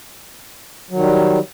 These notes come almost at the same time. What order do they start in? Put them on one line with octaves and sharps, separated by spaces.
F#3 D#3 G3